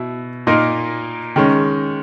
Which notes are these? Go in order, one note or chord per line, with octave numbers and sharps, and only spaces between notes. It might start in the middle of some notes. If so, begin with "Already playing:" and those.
Already playing: B2 E4
A#2 A#3 D#4 A#4
D#3 G#3 C#4